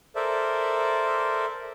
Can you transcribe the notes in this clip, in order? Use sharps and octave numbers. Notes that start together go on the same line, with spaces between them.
A4 A#4 C5 D5 E5